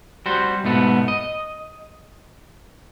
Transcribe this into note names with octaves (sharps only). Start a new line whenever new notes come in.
G3 F#4 C5
G#2 B2 A3 B3
D#5